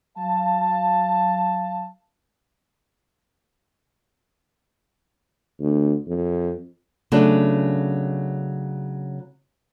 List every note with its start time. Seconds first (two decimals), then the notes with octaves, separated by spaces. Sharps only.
0.18 F#3 F5 A5
5.60 D2
6.07 F2
7.12 C#3 F#3 A3 B3 C#4 D4